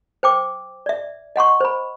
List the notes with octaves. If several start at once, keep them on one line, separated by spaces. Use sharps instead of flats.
C5 G5 D6
D5 E5
D#5 F#5 C6 C#6
C5 B5